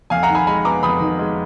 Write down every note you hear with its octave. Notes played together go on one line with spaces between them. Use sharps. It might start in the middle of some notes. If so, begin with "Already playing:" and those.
F2 F5 G#5
F#5 A#5
D#3
G#5 B5
G#3 G#5 B5
B3 A#5 D6
F2 B5 D#6
D#3
G#3